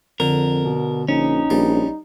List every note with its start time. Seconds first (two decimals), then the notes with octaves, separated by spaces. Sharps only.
0.20 F2 D3 A#4
0.64 B2
1.08 A#1 C#4 D#4
1.50 A#1 G3